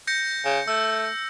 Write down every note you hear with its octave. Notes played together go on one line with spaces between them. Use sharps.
G6 A#6 C#7
C#3
A3 E6